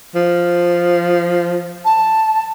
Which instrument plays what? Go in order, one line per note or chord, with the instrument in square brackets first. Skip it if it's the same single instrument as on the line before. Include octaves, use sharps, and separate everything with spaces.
[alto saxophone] F3
[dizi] A5